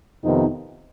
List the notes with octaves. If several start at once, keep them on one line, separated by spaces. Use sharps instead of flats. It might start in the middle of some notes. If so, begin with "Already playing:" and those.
F2 C3 D#3 B3 D#4